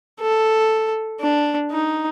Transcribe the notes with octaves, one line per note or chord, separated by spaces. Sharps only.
A4
D4
D#4